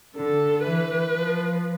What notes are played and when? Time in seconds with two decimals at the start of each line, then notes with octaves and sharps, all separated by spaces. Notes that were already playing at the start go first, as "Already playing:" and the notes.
0.16 D3 A4
0.64 E3 B4
1.12 F3